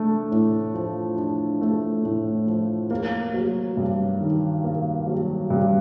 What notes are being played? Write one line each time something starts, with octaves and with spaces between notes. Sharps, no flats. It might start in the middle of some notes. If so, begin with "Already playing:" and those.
Already playing: A3 D4
A2
F3
D4
A3
A2
F3
A#3
F#3
G2
D#3
A#3
F#3
G2